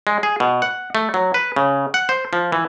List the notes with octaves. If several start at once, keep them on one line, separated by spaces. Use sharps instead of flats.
G#3
G#4
B2
F#5
A3
F#3
B4
C#3
F#5
C5
F3
E3